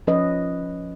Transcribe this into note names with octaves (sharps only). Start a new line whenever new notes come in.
F3 C#4 B4 D#5